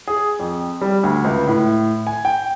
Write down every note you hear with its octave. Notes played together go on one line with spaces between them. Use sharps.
G#4
F2
G3
D2
C#2
A2
G#5
G5